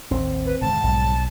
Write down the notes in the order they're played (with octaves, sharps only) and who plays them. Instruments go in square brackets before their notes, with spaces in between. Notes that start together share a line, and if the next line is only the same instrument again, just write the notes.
[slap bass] A1 D#2 [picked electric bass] C4
[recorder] B4
[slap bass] D#1 G#2 D3 [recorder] A5
[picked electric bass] B1 [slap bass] G#2 G3 G#3